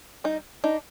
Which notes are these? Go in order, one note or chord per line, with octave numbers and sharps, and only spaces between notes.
G3 D#4
D4 D#4